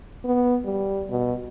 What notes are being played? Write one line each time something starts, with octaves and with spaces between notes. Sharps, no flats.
B3
G3
B2